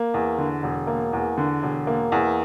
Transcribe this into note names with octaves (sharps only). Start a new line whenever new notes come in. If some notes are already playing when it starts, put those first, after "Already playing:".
Already playing: A#3
E2
D3
E1
A#3
E2
D3
E1
A#3
E2